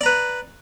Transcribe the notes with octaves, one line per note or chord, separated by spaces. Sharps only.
B4 D5 A#5